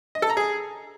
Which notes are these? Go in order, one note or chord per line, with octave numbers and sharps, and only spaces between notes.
D#5
A4
A#5
G#4